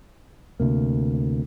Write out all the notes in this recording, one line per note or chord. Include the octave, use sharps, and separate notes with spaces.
D2 C3 A#3